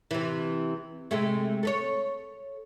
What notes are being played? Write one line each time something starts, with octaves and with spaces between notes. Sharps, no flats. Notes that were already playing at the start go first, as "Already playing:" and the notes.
C3 E3
C3 G#3 A3
A4 B4 C#5